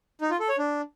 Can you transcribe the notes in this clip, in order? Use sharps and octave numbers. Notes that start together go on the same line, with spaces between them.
D#4
F4
A4
C#5
D4